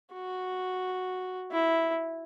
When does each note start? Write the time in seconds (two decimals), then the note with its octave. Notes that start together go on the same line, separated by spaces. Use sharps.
0.14 F#4
1.51 E4